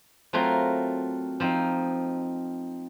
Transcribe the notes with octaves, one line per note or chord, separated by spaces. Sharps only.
F#3 A3 C4 F4 A#4
F3 C4 D#4